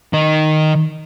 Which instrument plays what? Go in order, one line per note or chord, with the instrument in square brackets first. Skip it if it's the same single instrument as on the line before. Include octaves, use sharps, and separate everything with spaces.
[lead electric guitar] D#3 D#4